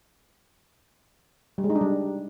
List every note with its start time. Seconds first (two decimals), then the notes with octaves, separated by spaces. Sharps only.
1.58 G3
1.64 G#3
1.70 D#4
1.75 D4
1.81 G3